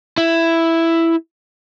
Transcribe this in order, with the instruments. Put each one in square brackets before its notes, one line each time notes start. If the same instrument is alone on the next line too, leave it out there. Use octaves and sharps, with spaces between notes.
[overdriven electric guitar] E4